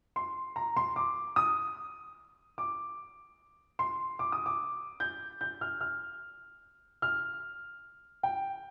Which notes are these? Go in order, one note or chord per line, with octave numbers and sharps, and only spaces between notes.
C6
A#5
C6
D6
D#6
D6
C6
D6
D#6
D6
G6
G6
F6
F6
F6
G5